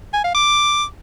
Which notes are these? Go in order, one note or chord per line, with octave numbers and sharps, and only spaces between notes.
G#5
F5
D6